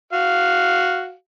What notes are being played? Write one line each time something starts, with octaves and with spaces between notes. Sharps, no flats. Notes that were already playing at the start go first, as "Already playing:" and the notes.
F#4 F5